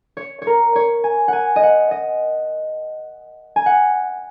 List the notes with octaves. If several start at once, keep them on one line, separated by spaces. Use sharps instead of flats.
C#5
C#5
A#4
C#5
G#5
F#5 G#5
D#5
F#5
D#5
G#5
F#5